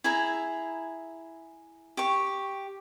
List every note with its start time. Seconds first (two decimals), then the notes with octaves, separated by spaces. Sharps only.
0.04 E4 G#4 A#5
1.97 G4 C#6